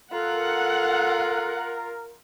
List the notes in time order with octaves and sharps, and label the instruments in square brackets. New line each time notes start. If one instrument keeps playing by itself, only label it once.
[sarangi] F4 [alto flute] A4 [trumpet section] A#4 [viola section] F#5